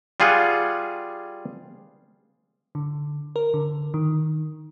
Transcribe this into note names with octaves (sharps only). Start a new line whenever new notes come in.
G3 F4 G#4 F5 F#5
D3
A#4
D3
D#3